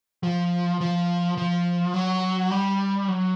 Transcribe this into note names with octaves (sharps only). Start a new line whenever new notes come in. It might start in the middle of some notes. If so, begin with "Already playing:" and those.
F3
F3
F3
F#3
G3
F#3